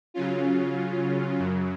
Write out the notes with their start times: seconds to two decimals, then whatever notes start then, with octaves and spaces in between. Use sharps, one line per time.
0.14 C#3 F#3 C#4 F4
1.39 F#2 C#3 F#3